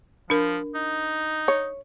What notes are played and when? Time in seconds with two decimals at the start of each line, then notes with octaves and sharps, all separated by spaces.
0.30 F3 D4 A#4
0.75 D#4
1.48 C#5